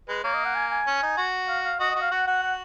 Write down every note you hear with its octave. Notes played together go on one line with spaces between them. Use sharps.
G#3 B4
A#3 C#5
D#5
F#5
G#5
G#5
C#4
D#4
F#4
F5
F5
F#4 D#5
D#5
F#4
F5
F#4 F#5
F#4 F#5
F#5